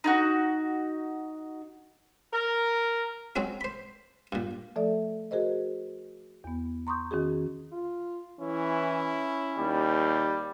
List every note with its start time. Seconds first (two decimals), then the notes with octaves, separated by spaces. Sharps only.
0.04 D#4 E4 F#4
2.33 A#4
3.36 F#3 G#3 C4 C#4 F#4
3.61 C5 B5
4.32 G2 A#2
4.76 F3 A3 A4 D5 E5
5.31 F#4 G#4 A#4 C5 D#5
6.44 E2 B3
6.87 A#5 C6 C#6 D#6 G6
7.11 D#3 C#4 F#4 G#4
7.72 F4
8.40 E3 C#4 E4
9.58 D#2 G3